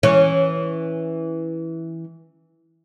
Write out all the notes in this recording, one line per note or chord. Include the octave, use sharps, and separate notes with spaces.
E3 C#4